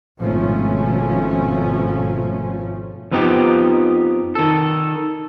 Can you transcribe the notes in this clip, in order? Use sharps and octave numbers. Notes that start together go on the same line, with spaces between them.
G#1 B2 F3 A3 C#4
F2 F3 B3 D#4 G4
D#3 A4